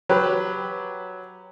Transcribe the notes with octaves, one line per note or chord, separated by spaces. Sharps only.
F#3 G4 B4